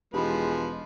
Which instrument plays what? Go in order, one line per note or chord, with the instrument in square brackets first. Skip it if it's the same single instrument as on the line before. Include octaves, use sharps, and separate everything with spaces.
[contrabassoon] E1 [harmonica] F3 B4 [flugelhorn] G#3 [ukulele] D#4 G4 B5